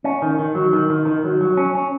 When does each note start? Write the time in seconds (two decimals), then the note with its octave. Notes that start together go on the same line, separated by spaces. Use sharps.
0.04 C#4
0.22 D#3
0.39 D#3
0.55 F#3
0.73 D#3
0.90 D#3
1.06 D#3
1.24 F#3
1.41 F#3
1.57 C#4
1.75 C#4